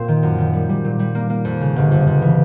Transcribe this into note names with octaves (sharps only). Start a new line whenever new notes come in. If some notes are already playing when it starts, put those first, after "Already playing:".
Already playing: A#2 A#3 C4
D#3
F#2
D#3
G3
G3
A#2
G3
A#3
A#3
F2
C#3
G1
F2
F2
E3